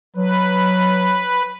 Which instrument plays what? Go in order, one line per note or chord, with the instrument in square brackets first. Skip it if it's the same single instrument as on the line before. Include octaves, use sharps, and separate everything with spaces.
[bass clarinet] F#3 [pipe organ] B4